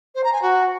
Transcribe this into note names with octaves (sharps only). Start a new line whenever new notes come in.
C5
A#5
G#5
F#4